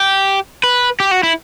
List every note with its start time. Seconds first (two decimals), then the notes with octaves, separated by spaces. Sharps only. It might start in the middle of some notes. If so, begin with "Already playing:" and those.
Already playing: G4
0.64 B4
1.00 G4
1.11 F#4
1.23 E4